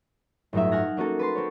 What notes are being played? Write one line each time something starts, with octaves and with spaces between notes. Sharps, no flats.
G1 A2 F#3 D#4 E5
F#5 G#5 F6 A#6
A#3 C#4 F#4 A4
B4 A5 C6
C4 C#5